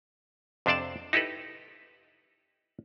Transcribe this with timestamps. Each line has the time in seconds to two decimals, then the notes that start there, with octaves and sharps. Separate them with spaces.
0.66 F2 C3 D4 C5 D5 A5
1.13 D#4 E4 G4 A4 B4